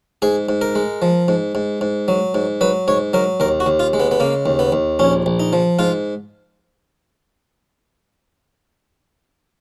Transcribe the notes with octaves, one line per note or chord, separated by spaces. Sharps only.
G#2 G#4
G#2
A#4
G#3
F3
G#2
G#2
G#2
F#3
G#2
F#3 B4
G#2 C#5
F#3 A#4
D#2 A#4
F#4
D#2
F4
G#3
B3
B3
C#3 A#3
D#2
B3
D#2
A#1 C#4
A#1
D#4
F3
G#2 F4